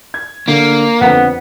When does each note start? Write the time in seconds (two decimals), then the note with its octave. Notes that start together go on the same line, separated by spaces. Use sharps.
0.14 G#6
0.48 D3 A#3
1.01 F2 D3 B3